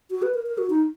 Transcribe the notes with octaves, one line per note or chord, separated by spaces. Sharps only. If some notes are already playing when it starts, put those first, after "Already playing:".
F#4
B4
A#4
A#4
F#4
D#4